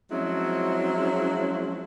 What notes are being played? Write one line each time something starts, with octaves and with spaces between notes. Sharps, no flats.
F3 F#3 G#3 C4 C#4 E4